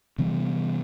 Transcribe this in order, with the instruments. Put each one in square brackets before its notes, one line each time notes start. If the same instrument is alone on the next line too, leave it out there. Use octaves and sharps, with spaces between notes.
[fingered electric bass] C3 E3 G3 B3